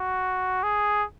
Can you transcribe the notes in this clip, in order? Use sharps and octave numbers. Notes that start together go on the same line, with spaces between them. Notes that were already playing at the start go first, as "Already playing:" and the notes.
Already playing: F#4
G#4